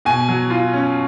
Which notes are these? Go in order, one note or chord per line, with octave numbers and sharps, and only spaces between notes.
B2 G#5
F#3
F4
C#4